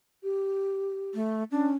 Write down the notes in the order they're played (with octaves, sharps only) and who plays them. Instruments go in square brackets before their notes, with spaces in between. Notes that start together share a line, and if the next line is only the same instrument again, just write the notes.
[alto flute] G4
[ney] A3
[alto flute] C#4 [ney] D4